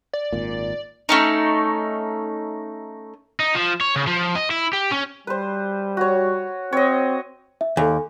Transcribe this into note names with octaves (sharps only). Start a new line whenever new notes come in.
D5
G#1 A#2
A3 C#4 D#4
D#4
F3
C#5
C#3
F3
D#5
E4
G4
C#4
G3 B4 C5
F#4 C#5
C4 C#5 D#5
E5
D#2 A4 G#5